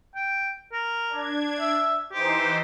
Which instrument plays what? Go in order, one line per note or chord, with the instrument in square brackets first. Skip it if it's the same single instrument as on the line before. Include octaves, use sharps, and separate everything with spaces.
[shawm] G5
A#4
[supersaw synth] D4 G#6
[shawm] E5
[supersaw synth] E3 D#4 C5 [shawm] G4